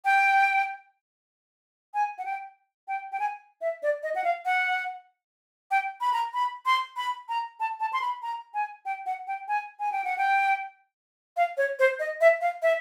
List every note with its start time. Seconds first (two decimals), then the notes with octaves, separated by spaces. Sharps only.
0.05 G5
1.94 G#5
2.18 F#5
2.25 G5
2.88 G5
3.12 G5
3.20 G#5
3.61 E5
3.83 D5
4.03 D#5
4.15 F#5
4.24 F5
4.45 F#5
5.71 G5
6.01 B5
6.13 A#5
6.34 B5
6.66 C6
6.97 B5
7.29 A#5
7.60 A5
7.80 A5
7.93 C6
8.01 B5
8.23 A#5
8.54 G#5
8.85 G5
9.06 F#5
9.28 G5
9.48 G#5
9.80 G#5
9.92 G5
10.04 F#5
10.18 G5
11.37 F5
11.57 C#5
11.79 C5
11.99 D#5
12.21 E5
12.41 F5
12.63 E5